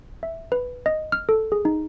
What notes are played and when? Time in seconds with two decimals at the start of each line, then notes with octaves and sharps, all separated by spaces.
0.23 E5
0.52 B4
0.86 D#5
1.12 F6
1.29 A4
1.52 G#4
1.65 D#4